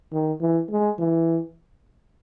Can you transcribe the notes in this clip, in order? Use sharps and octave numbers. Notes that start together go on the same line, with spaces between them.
D#3
E3
G#3
E3